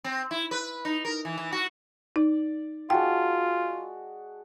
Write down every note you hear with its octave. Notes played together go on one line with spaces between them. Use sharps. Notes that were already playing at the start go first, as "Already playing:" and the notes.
C4
E4
B4
D#4
A#4
E3
E3
F#4
D#4 D5
G#3 F4 F#4 G5 A5